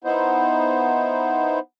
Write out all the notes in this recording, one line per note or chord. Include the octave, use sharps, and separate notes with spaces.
B3 D#4 E4 C5